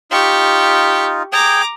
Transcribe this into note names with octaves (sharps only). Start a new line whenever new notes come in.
D#4 F4 G4 C#6
G#4 G5 A#5 D6